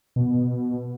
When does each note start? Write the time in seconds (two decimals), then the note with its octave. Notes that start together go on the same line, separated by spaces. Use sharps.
0.16 B2